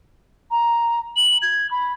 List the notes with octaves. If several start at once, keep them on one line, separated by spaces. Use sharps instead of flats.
A#5
F#7
G#6
B5